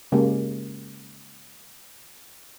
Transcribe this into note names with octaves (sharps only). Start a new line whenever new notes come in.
C#3 G#3 A#3 C#4 G4